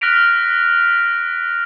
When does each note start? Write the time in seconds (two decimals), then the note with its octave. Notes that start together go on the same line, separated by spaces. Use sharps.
0.01 F6 F#6 A#6 B6 D7 F7